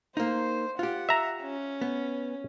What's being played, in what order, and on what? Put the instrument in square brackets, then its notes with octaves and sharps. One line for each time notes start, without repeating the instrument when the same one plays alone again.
[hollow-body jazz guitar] A#3 D#4 [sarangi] C5
[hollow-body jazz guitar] F4 G4 [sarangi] F#5
[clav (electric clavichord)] E5 A#5
[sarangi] C#4
[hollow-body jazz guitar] B3